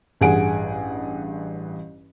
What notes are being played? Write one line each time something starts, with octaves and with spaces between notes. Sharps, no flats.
A1 G2 G#4 F#5 G#5 D7